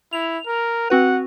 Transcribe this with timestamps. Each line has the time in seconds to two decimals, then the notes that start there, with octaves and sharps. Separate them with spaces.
0.13 E4 F7
0.46 A#4
0.90 C4 F#4 B4 F#5